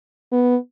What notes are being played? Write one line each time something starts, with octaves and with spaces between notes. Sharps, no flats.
B3